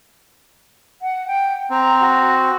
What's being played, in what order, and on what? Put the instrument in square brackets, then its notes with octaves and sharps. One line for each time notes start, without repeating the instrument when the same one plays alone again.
[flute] F#5
G5
[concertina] C4 [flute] A#5
[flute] F#4